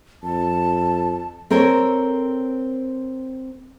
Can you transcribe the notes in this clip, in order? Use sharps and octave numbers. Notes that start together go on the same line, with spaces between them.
F2 A5
C4 A4 A#4 C5 C#5